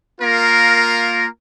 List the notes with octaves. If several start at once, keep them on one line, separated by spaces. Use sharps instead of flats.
A#3 F4 A#4